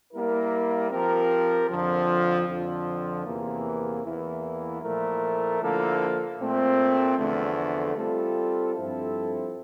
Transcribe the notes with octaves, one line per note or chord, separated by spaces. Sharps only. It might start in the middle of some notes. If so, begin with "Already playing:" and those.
G3 A#3 E4 A#4
F3 C4 G4 A#4
F2 D3 F3
F2 D3 F3
E2 C3 E3 A#3
E2 E3 A#3 E4
A#2 F3 A3 E4 A#4
D3 F3 A#3 E4 A4
A#2 A3 C4
E2 D3 F3 A3
G3 C4 F4 A4
G2 F3 C4 E4 A4